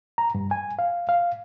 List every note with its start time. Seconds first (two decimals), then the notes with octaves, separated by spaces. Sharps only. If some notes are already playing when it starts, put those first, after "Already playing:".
0.18 A#5
0.35 G2
0.51 G#5
0.79 F5
1.09 F5